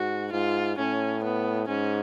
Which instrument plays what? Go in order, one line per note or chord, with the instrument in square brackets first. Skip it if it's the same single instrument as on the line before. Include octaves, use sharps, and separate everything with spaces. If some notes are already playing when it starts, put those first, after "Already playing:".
Already playing: [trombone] G#2 [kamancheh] F#4
[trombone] G#2 [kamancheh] F4
[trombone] A2 [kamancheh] C#4
[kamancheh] B3
[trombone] G#2 [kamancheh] C#4